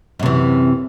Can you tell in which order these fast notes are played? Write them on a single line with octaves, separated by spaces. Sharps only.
F#2 C3 E3